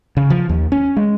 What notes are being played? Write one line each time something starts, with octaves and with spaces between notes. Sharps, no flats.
C#3
F3
D#2
C#4
G#3